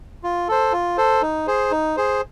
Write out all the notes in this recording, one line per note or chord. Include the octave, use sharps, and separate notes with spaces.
F4
A4 C5
F4
A4 C5
D#4
G#4 C5
D#4
G#4 C5